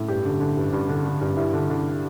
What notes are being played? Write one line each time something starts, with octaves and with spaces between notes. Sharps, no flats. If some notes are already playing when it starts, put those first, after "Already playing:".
Already playing: A2
G2 G4
D3
D3
G2
G2
D3
D3
G2
G2 E4
D3
D3